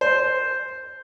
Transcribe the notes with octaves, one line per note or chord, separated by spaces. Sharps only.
C5